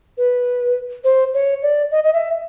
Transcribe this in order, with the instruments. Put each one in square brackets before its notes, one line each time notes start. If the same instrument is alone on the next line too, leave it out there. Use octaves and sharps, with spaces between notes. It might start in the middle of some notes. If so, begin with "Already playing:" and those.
[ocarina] B4
C5
C#5
D5
D#5
D#5
E5